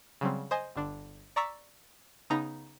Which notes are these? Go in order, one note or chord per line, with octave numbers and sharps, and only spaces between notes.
C#3 F#3 G3 C4
C5 D#5 G#5
G1 D3 D4
D5 A#5 C#6 E6 A6 B6
C#3 B3 D#4 A#5